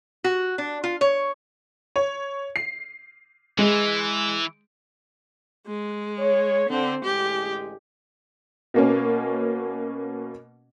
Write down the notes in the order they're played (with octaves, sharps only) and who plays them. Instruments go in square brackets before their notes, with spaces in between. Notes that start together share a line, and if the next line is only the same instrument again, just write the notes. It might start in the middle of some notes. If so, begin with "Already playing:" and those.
[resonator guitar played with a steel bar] F#4
D4
F4
C#5
[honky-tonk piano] C#5
C7
[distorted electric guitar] E3 [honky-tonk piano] G#3
[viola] G#3
[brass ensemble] C#5
[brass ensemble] D3 [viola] C4
[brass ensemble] A1 D3 G#3 [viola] G4
[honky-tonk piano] B2 A#3 C#4